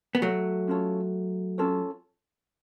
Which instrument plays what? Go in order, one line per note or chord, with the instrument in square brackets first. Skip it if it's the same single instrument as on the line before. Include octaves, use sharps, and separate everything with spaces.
[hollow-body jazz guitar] B3
F#3 A3
[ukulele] C#4 F4 A4 C#5
C#4 F4 A4 C#5